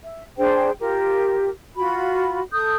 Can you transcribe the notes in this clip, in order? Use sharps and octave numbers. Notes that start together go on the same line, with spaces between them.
E5
D4 G#4 C5 G5
F4 G4 A#4
F4 F#4 B5
A4 D#6 G6